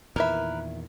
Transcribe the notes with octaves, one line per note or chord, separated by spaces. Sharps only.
E2 A#2 D#3 E4 A#4 B4 E5 B5